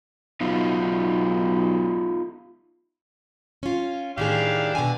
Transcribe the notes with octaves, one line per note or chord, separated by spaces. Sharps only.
B1 B3 D#4 F4
C#4 F4
A2 D#3 D4 G4 G#4 F5
B2 D3 G#5